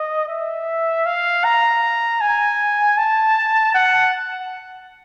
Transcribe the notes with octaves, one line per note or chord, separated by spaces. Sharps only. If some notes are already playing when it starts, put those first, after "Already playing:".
Already playing: D#5
E5
F5
A#5
G#5
A5
F#5